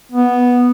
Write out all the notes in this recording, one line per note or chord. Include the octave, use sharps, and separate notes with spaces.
B3